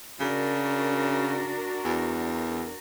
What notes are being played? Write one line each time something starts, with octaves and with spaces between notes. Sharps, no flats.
C#3 D4 F#4 A#4
E2